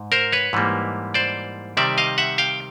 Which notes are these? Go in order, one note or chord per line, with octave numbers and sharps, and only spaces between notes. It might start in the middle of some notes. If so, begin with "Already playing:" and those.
Already playing: G#2
A#4 C5
B4 C#5
G#2 E3 G3 A#3
C5 D5
C3 D#3 G3 C4 D5 E5
D#5 F5
E5 F#5
F5 G5